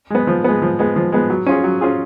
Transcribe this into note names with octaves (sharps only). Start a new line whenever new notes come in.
G#3 B3
F3
G#3 B3
F3
G#3 B3
F3
G#3 B3
F#3
C#4 F4 G#4
F#3
C#4 F4 G#4